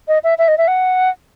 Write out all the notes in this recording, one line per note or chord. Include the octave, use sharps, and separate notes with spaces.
D#5
E5
E5
D#5
E5
F#5